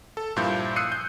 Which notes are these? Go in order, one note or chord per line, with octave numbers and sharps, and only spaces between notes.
A4
G2 A#2 F3 E4 F4 G6
D#6 E6 F#6 C7 C#7 D#7
G6